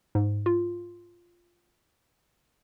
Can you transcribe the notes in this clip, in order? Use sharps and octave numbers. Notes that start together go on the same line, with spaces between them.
G#2
F4